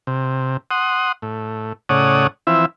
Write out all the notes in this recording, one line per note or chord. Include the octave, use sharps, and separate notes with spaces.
C3
F#5 C6 D#6
A2
A2 C#3 C#5 D5 F#5 D#6
E3 F3 C4 E4 E5